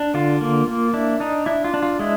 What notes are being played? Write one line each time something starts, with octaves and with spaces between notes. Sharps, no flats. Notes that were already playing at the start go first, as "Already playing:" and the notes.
Already playing: D4
D3 F4
A#3
A#3
D4 E4
D4 D#4
D4 E4
F4
D4
F4
G#3 E4